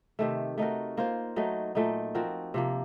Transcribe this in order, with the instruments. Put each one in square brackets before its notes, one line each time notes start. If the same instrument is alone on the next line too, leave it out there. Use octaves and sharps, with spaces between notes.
[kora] C3 D#3 A3
A3 D#4 F#4 A#4
A#3 F4 C5
F#3 A3 D#4
A#2 A3 D#4
F3 C4 F#4 A#4
C3 F3 A#3